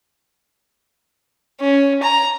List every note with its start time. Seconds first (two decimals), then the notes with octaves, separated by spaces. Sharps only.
1.60 C#4
2.03 A#5